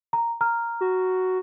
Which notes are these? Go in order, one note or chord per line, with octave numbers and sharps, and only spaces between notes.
A#5
A#5 F6
F#4